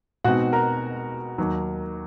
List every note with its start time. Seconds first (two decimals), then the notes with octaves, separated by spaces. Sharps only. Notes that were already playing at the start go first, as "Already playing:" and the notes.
0.24 B2 G#3 C4 D#4 F#4 F#5
0.53 A#4 A#5
1.38 D#2 D#3 F#3